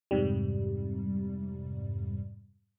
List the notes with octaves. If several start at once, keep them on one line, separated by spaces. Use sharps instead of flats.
F2 G#2 C3 G3